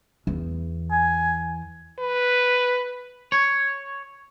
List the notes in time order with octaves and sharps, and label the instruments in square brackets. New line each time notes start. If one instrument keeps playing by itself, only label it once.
[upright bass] E2
[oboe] G#5
[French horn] B4
[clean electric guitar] C#5